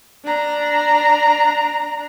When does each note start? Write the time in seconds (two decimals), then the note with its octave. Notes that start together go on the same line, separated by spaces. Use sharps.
0.25 D4 A#5